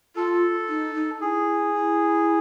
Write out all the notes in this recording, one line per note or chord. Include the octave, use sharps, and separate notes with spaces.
F4 A4
D#4
D#4
E4 G#4
E4